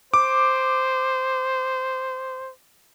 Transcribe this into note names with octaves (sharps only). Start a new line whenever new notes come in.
C5 D6